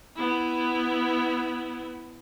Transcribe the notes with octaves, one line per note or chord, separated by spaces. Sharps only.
B3 E4